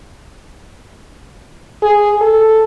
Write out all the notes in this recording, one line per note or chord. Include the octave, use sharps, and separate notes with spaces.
G#4
A4